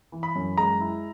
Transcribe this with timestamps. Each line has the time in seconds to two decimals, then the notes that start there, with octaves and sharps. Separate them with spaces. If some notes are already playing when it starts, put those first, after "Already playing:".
0.12 E3
0.23 B5
0.35 F#2
0.57 G#3 A#5
0.81 E4